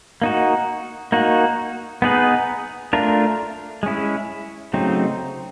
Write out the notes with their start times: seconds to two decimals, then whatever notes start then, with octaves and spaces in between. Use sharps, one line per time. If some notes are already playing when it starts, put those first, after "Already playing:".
0.22 A#3 D#4 F#4
1.12 A#3 D#4 F#4
2.02 B3 D#4 G#4 B4
2.93 A3 D4 F4 A#4
3.83 G#3 C#4 E4
4.73 C#3 F#3 A3 C4 D#4